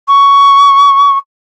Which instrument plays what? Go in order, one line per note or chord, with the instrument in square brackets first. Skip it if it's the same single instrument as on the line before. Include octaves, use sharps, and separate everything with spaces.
[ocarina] C#6